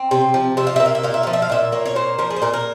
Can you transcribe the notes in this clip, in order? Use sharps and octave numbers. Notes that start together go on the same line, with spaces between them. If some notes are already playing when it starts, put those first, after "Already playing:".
Already playing: C4
C3
F3
C3 E5
F5
A#3 E5
F5
E5
A#2 F5
E5
F3 F5
E5
F5
A#2 E5
A#3 C#5
C#5
A#2 C5
F3 A#4
G#4
C5
A#2 A#4
A#4